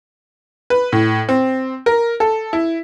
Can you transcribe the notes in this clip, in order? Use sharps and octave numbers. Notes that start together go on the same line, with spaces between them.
B4
A2
C4
A#4
A4
E4